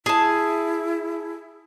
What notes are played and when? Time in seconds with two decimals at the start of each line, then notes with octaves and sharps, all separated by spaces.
0.06 E4 G#4 A5